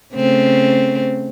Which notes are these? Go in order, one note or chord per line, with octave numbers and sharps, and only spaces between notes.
C#3 A3 C4